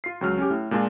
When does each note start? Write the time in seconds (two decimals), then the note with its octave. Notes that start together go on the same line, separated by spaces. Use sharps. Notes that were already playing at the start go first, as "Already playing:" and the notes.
0.04 F4 C7
0.21 C#2 F#3 F6
0.38 C#4 G4
0.50 A2
0.71 A#2 G#3 D4 F4